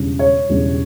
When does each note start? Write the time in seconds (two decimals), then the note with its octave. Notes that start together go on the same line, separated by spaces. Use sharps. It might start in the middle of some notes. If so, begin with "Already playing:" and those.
Already playing: E1 E2 C#3 G3 D4
0.19 C#5
0.49 E1 E2 C#3 G3 D4